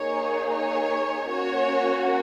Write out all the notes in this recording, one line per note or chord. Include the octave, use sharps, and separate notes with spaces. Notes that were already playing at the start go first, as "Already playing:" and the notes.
Already playing: A#3 D#4 G#4 C#5
C#5
A#3 C#4 F#4 C#5